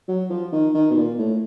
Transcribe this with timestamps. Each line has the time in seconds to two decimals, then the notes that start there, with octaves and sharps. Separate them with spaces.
0.09 F#3
0.30 F3
0.52 D#3
0.75 D#3
0.91 B2
0.97 A#2
1.19 A2